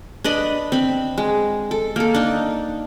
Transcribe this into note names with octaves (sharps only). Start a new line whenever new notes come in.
D4 B4 D#5 B5
C4 B5
G#3
A4
A#3 A4
D4 D#4